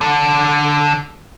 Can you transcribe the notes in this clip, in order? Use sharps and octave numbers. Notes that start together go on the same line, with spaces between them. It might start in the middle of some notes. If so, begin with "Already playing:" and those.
D3 A4